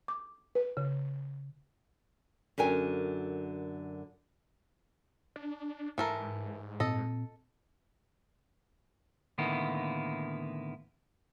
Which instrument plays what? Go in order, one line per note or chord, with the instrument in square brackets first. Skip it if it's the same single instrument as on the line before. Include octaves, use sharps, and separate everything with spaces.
[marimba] D6
B4
C#3
[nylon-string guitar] F#2 D3 A#4 G#5
[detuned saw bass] D4
[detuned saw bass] G#2 [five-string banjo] E3 A4 A#4
[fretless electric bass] A#2 C4 [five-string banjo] A4 D#5
[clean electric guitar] A2 D3 D#3 A#3 B3 E4